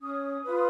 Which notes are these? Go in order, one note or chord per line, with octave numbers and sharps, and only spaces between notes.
C#4 D#6
F4 B4